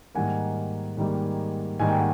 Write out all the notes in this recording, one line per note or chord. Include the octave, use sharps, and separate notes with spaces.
G#2 D#3 G3 A#3 F#5 G#5
G#2 D#3 G3 A#3
G#2 D#3 G3 A#3 G#5
G5
F#5